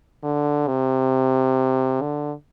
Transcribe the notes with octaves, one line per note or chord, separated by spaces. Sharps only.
D3
C3
D3